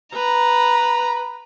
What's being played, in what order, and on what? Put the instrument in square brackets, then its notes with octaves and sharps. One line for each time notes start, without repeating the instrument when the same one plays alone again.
[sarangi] B4 [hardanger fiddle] A#5